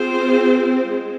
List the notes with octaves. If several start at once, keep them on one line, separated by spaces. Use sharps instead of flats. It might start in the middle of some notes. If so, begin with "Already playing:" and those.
Already playing: C4 F4 G#4 C5
G#3